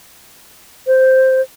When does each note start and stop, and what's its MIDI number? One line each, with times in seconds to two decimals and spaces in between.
0.87 1.41 72